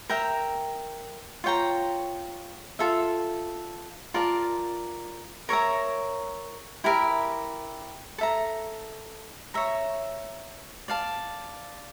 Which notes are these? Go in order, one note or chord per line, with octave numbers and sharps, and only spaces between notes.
A#4 E5 G5 A#5
F4 C#5 G5 A#5
F4 A4 E5
F4 A#4 D5 A5
A#4 C#5 E5 A#5
E4 G4 A#4 E5
A4 E5 A#5
C#5 E5 A#5
D5 F5 A5